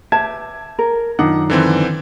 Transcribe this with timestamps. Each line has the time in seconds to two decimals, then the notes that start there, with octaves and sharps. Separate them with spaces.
0.12 G4 B4 E5 A5 G#6
0.79 A#4
1.19 F#2 D#3 D4 D#4 F4 F#5
1.50 D3 E3 C4